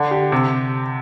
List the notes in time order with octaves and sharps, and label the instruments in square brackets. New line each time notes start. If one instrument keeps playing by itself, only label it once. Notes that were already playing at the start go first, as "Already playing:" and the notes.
Already playing: [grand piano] D3
G4
C3